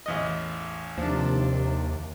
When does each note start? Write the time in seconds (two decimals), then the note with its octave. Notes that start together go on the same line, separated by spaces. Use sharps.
0.06 A1 E2 D#5
0.98 D#2 C3 F3 D4